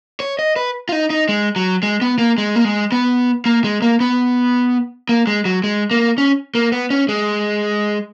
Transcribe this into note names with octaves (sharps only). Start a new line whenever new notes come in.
C#5
D#5
B4
F4
D#4
D#4
G#3
F#3
G#3
B3
A#3
G#3
A#3
G#3
B3
A#3
G#3
A#3
B3
A#3
G#3
F#3
G#3
A#3
C#4
A#3
B3
C#4
G#3